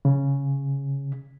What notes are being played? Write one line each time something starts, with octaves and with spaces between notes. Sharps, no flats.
C#3